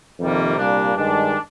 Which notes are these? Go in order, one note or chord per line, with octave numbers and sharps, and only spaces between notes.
F2 C3 D#3 G3 A#3
C2 A#2 G3 A#3 D4
G2 D#3 G#3 D4